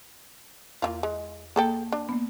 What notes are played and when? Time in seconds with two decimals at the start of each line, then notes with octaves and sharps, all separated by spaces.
0.82 E2 A#3 E4 F4
1.03 G#3
1.56 A#3 G#4 A4 G5
1.92 D4
2.09 A#3 B3